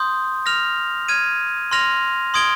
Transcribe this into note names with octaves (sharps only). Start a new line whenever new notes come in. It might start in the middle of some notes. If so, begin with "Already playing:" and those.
Already playing: C6 D#6 G6
F6 A#6 F7
F6 G#6 D#7
C6 F6 A#6 F7
C6 D#6 G#6 D7 G7